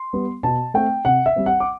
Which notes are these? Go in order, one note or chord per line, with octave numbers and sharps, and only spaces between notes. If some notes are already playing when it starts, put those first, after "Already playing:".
Already playing: C6
G3 B3
B2 A5
A3 C4 G5
C3 F#5
E5
G3 C4
F#5
D6